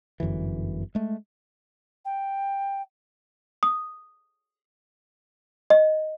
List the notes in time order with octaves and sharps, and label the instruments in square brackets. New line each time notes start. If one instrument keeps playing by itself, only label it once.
[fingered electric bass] G1 F#2 D3 E3
G#3 A3
[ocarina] G5
[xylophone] D#6
D#5